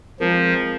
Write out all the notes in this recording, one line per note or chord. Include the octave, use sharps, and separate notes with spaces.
F3 G#3 C4 F4 A#4